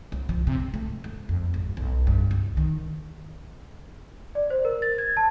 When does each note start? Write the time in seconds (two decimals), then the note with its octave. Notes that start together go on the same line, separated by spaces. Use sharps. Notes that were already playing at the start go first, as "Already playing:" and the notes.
0.12 C2
0.29 F3
0.47 C3
0.60 G#1
0.74 A3
1.04 A3
1.29 F2
1.54 G#1
1.77 B1
2.07 G2
2.31 C2
2.57 D#3
4.35 D5
4.50 C5
4.65 A#4
4.82 A6
4.98 G#6
5.17 A5